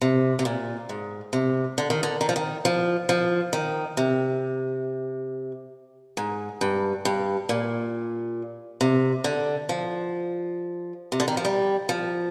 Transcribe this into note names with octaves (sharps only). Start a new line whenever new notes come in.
C3
C3
A#2
G#2
C3
D3
D#3
D3
D#3
F3
D#3
F3
F3
D#3
C3
G#2
G2
G2
A#2
C3
D3
F3
C3
D3
D#3
F3
G3
F3